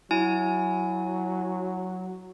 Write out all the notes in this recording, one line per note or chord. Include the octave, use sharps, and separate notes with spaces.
F#3 E4 G#5